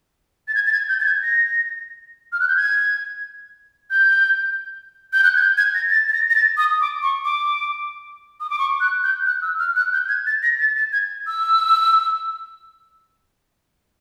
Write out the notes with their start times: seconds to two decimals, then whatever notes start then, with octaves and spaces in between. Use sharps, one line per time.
0.48 A6
0.55 G#6
0.67 A6
0.72 G#6
0.89 G6
1.00 A6
1.05 G#6
1.23 A#6
2.32 F6
2.40 F#6
2.48 G6
2.56 G#6
3.90 G6
5.13 G6
5.24 F#6
5.36 G#6
5.41 G6
5.57 G#6
5.74 A#6
5.90 A6
6.08 A6
6.13 A#6
6.30 A#6
6.35 A6
6.57 D#6
6.81 D6
7.03 C#6
7.25 D6
8.40 D#6
8.50 D6
8.59 C#6
8.80 F#6
9.03 G6
9.26 F#6
9.42 E6
9.59 F6
9.76 F#6
9.93 G6
10.09 G#6
10.27 A6
10.43 A#6
10.59 A6
10.76 A6
10.93 G#6
11.27 E6